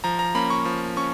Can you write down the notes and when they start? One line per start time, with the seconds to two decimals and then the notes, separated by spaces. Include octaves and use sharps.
0.04 F3 A#5
0.19 A#5
0.35 A#3 C#4 B5
0.50 C#6
0.65 F3
0.97 C#4 C#6